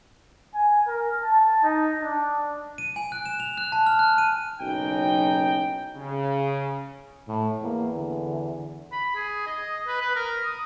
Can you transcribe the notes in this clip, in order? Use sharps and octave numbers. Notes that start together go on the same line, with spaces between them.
G#5
A#4
A5
D#4
D4
D#7
G#5
F#6
E7
F7
F#6
A5
F6
F#6
D#7
F#1 B1 C#4 D#4 G5
C#3
A2
E2 A#3
D3
B5
G#4
D#5
B4
B4
A#4
D#6